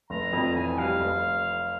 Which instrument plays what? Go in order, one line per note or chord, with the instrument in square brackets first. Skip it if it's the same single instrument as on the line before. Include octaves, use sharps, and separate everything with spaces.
[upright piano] F1 [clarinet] A#5
[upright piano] F2
[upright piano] E3 [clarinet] G#5
[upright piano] G3 [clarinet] F5
[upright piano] F1